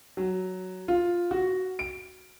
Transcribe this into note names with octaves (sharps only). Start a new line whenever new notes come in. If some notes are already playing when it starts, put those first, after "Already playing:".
F#3
F4
F#4
D7